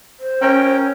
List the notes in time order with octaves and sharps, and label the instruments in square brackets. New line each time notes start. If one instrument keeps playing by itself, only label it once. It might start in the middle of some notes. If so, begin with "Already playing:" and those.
[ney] C5
[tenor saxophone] C#4 [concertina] A#4 G5